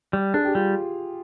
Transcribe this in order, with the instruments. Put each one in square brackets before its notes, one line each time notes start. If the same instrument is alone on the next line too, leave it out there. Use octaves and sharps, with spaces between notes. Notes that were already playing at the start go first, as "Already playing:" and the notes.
[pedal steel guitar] G3
[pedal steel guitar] D4 [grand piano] G#4
[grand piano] G4
[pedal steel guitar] G3 [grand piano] F4